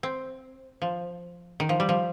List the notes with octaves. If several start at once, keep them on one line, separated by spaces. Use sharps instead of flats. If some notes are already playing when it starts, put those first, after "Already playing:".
C4
F3
D#3
F3
G3
F3